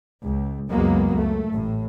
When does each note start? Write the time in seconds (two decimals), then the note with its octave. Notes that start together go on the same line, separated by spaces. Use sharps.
0.23 C#2
0.71 C#2 F#2 F#3 G#3 A#3 B3
1.13 C#2 A3
1.51 A1 A2